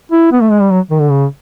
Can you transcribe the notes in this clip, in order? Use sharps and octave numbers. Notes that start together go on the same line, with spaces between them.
E4
B3
A3
G#3
G3
F#3
D#3
D3
C#3